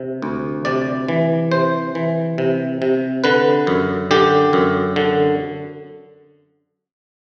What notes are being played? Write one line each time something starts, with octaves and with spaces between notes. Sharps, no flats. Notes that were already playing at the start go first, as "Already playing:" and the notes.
Already playing: C3
D2
C3 D5
E3
C3 C5
E3
C3
C3
D3 B4
F#2
D3 G4
F#2
D3